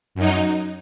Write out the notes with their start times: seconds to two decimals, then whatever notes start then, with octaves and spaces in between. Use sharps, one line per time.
0.15 F#2 F#3 D#4